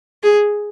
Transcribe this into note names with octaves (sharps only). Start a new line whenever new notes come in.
G#4